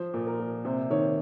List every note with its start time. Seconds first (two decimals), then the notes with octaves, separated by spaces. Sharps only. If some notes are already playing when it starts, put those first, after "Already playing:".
Already playing: F3 C5
0.14 A#2
0.27 A#4
0.40 A#2
0.65 C3 C5
0.90 D#3 C#5